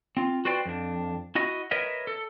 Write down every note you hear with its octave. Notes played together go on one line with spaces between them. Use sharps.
C4 F4
F#4 B4 C5 D5 G5
F2 D4
E4 F#4 D#5
A#4 B4 C#5 D#5 E5
A4